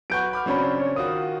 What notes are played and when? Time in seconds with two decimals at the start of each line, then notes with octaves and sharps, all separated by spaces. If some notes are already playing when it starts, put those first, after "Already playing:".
0.10 F#3 B4 F#5 C#6 G6 D7
0.33 B5 D6 F6
0.46 C#3 F#3 C4 D4 C#5 B5
0.80 C#5
0.96 D#3 F4 F#4 D#6